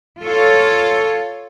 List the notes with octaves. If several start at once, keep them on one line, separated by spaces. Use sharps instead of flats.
F4 A4 C#5